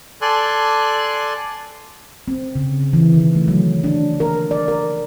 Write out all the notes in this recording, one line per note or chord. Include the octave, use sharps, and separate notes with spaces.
A4 D5 G#5 C6 F#6
C4
C#3
E3
D#3
A3
F#3
D4
A#4
D5
A#4